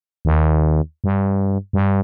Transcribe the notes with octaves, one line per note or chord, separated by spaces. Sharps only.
D#2
G2
G2